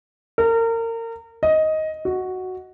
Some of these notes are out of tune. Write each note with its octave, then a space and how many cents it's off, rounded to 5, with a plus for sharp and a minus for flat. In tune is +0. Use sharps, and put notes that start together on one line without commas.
A#4 -30
D#5 +10
F#4 +0